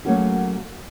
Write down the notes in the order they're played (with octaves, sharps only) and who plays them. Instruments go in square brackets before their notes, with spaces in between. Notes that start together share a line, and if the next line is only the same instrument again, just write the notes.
[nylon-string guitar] F#3 A3 A#3 C#4 F#4 G#4